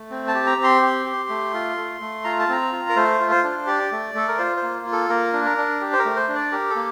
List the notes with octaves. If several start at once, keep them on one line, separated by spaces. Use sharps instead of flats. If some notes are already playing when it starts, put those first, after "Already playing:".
Already playing: A3
C4
A5
G4
A#5
C4
C6
G4
G4
A3
F4
A3
A3
F4 A#5
A5
C4 A#5
F4
A#4
A3 C5
F4
C5
D4
G4 D5
A3
A3 A4
A#4
F4 C5
C5
A#3
F4
A4
A#3 A#4
D4
A#4
D4
G4
C5
A#4
A3
C5
D4
D5
G4 A#4
A4
A#3